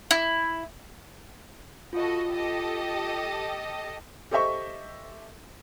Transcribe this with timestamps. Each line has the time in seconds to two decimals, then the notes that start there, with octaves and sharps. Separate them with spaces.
0.11 E4
1.93 F4 F#4 A4 D#5
2.32 G4 A4 D#5
4.31 G4 A4 C5 D#5 E5 C#6